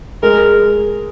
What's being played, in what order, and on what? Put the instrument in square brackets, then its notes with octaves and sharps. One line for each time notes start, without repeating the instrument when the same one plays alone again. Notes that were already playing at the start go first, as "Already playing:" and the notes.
[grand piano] G#3 [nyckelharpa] A#4